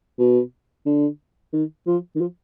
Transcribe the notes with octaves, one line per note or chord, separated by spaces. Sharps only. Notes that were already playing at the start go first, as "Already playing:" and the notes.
B2
D3
D#3
F3
D#3
F3